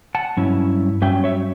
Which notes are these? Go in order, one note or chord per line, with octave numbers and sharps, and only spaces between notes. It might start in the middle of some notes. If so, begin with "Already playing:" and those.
F#5 A5
G2 F#3 C#4 E4
G2 F#3 C#4 E5 G5
C#5 E5